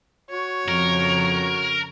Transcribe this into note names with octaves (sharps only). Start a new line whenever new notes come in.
F#4 C#5
F2 C#3 A#4